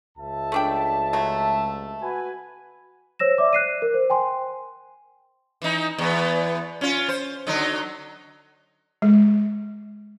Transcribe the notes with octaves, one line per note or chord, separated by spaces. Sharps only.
C#2 E5 A5
A3 D4 G5
F#3 A3 C4
F#4 B4 G#5
C5 C#5 E6 A#6 E7
D5 E5 D6
F#6 C7 D#7
A#4
C5
G5 G#5 C6
E3 D#4
E2 B3
C#4 F4
C5
D3 F#3 D#4
G#3